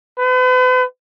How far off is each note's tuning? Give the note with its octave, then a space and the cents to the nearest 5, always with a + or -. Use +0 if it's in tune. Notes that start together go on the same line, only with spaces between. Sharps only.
B4 +40